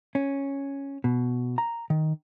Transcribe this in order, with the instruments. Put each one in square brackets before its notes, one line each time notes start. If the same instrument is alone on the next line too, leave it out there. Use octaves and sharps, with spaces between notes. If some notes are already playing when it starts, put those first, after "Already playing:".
[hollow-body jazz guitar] C#4
B2
A#5
D#3